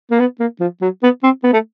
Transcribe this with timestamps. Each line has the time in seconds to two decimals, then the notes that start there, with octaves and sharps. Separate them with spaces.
0.11 A#3
0.20 B3
0.40 A#3
0.60 F3
0.82 F#3
1.03 B3
1.23 C4
1.44 B3
1.53 A3